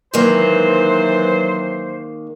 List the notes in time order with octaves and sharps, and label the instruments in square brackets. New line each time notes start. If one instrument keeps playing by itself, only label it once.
[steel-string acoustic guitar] D#3 G#3 A#3 [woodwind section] E3 F#3 C5